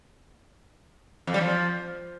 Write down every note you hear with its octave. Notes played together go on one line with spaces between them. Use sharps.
F2
G3
F3